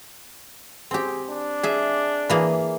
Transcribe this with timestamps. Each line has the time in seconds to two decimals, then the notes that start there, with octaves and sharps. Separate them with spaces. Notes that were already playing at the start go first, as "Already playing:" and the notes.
0.91 C4 G4 G#4
1.29 D4
1.63 G#4 E5
2.30 E3 A#3 G#4